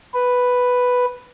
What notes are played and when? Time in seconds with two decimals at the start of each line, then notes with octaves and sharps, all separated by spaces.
0.14 B4